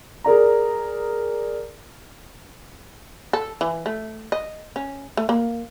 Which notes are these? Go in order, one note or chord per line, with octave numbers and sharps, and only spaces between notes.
G#4 A#4 D5 A#5
A4
E3
A3
D#5
C#4
A3
A#3